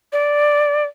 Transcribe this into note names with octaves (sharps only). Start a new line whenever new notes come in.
D5